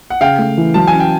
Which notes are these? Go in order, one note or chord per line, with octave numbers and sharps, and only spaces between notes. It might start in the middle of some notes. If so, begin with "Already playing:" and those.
F#5
C#3 F5 G5
A3
E3
F#3 A5
C#4 G#5
G5